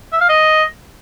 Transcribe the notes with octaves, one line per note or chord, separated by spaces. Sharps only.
E5
F5
D#5